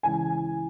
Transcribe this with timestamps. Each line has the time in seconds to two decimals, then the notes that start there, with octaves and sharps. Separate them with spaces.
0.03 C#2 C#3 E3 G#5